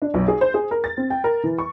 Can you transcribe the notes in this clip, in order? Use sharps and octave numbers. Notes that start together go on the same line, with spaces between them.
D4
B1
G#4
C5
G#4
A#4
A6
C4
G5
A#4
E3
C#6